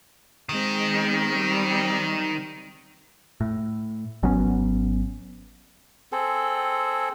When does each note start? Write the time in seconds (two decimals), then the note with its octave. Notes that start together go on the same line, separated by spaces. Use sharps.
0.49 D#3 G#3 C4
1.36 G3 C4
3.41 A2
4.23 G#1 F#3 B3 C#4
6.12 C4 G#4 A4